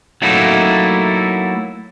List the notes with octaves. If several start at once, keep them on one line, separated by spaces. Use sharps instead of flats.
F#3 A3 A#3 D#4 E4